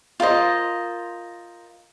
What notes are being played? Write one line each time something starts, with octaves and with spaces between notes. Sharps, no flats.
F4 A#4 C5 D#5